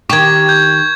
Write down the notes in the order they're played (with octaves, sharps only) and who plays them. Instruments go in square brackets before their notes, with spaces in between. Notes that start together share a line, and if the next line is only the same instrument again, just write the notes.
[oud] D#3 G4 [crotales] C#6 G#6
[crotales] G6